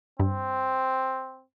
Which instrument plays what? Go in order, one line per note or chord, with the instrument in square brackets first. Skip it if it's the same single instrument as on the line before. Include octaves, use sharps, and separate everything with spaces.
[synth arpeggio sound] G2 [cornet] C4